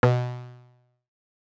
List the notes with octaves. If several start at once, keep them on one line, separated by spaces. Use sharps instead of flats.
B2